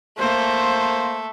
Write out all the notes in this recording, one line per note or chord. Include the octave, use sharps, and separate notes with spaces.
A3 A#3 C5